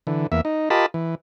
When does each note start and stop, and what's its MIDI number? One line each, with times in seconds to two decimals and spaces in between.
0.07 0.27 50
0.07 0.27 52
0.32 0.41 40
0.32 0.41 58
0.32 0.41 76
0.45 0.69 63
0.70 0.86 65
0.70 0.86 67
0.70 0.86 70
0.70 0.86 75
0.70 0.86 81
0.70 0.86 83
0.94 1.15 52